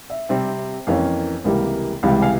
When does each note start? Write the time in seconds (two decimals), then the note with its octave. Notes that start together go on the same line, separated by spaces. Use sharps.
0.10 E5
0.29 C3 G3 C4
0.87 F2 E3 A#3 C#4 F5
1.45 C#2 C3 E3 G3 A#3
2.03 C#2 C3 E3 G3 F5
2.21 F5 G#5